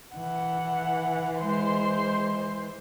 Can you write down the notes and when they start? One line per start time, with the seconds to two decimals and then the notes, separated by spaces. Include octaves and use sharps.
0.17 E3 F#5
1.40 G#3 C5 C6